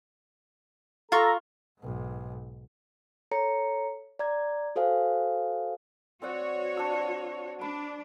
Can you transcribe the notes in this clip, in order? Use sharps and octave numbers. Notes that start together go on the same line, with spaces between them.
F4 A4 A#5 C#6
B1 G#2
A4 C#5 A#5 C#7
D5 A#5 G#6
F#4 A4 C5 F5 G#5
C4 F#4 C#5 D5 F#5
D4 E6
D4 B5